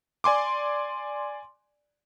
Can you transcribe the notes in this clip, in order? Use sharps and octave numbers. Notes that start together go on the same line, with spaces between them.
D5 G#5 C6 D6